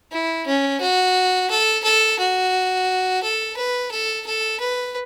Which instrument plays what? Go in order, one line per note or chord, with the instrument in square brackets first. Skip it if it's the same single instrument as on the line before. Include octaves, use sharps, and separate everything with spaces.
[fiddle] E4
C#4
F#4
A4
A4
F#4
A4
B4
A4
A4
B4